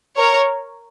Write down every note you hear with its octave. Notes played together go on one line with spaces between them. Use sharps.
A#4 C#5